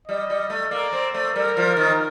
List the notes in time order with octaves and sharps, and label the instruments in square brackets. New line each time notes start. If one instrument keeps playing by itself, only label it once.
[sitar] G3 [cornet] D#5
[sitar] G3
A3
[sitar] A#3 [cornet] D5
[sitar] C4
A3
[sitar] G3 [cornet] A#4
[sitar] F3
D#3